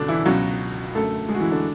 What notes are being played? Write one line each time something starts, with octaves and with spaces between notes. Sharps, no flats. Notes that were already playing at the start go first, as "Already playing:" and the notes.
Already playing: C#2 B2 D3 D4
E3 E4
C#2 B2 F#3 F#4
F#2 D3 A3 A4
G#3 G#4
F#4
E3 E4
D3 D4